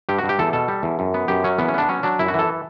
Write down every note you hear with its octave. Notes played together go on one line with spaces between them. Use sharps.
G2 G4
F#4
G2
G4
E2 A4
B2 A4
G3
E2
F#2
B3
F#2 G4
F#3 C#4
E2 B3
C#4
B3 D4
F#3 C#4
F#3 D4
F#2 E4
F#4
E3 A4